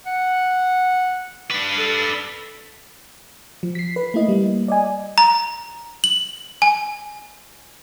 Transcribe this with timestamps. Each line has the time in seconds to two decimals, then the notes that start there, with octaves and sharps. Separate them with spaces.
0.07 F#5
1.51 D4 B4
1.78 A4
3.63 F3
3.75 B6 C7
3.96 B4
4.14 A3 A#3 E4 D#5
4.28 G3 A#3
4.68 D5 D#5 G#5
5.18 A#5
6.04 F#7
6.62 G#5